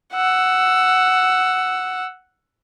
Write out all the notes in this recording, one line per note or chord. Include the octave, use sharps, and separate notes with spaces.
F#5 E6